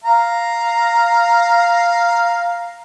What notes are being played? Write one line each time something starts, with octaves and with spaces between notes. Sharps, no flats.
F5 A#5